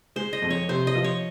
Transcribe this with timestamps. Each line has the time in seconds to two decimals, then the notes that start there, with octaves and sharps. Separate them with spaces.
0.16 G#3 C5
0.33 D#5
0.42 F2
0.50 C#5
0.69 C3 C5
0.87 D#5
0.95 F3
1.04 C#5